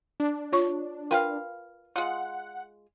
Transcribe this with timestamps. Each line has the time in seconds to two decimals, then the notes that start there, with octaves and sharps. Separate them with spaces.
0.20 D4
0.52 F4 C#5 C#6
1.11 F4 A#4 B4 F5 G5
1.96 G#3 F4 F#5